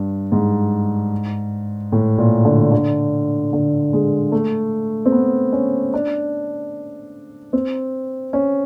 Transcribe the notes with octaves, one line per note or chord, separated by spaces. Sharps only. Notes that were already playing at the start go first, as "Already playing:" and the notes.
Already playing: G2
G#2
A2
A#2
D3
D3
D3
G#3
A3
C4
B3
C#4
D4
C4
C#4